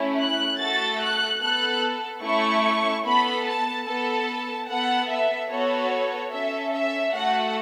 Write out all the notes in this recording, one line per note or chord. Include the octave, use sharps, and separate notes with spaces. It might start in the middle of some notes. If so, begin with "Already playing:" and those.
Already playing: A3 C#4 E4
F#6
A3 F#4 A4 A6
F#6
B3 A4 F#6
A3 C#4 E4 A4 C#6
B3 A4 B5
A5
B3 A4 A5
B3 A4 F#5
E5
B3 F#4 A4 C#5
C#4 A4 E5
E5
A3 F#4 A4 F#5